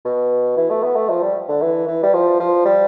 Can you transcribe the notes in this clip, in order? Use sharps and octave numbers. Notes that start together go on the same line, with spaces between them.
B2
E3
A3
B3
A3
F3
G3
D3
E3
E3
G3
F3
F3
G3